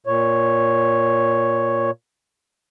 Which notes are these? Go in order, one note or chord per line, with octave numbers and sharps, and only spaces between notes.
A#2 C#5